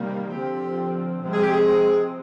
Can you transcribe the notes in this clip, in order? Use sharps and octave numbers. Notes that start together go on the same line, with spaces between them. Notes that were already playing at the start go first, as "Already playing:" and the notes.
Already playing: C3 D#3 G3 A#3
D3 F3 C4 G4
C3 F3 G#3 C4
G#4
G4
G#4